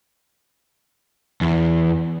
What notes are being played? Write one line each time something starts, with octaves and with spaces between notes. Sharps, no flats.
E2